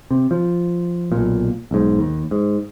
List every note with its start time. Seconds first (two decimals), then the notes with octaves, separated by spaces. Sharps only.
0.11 C3
0.31 F3
1.12 B1 A#2
1.71 B1 G#2
1.99 D#2
2.31 G#2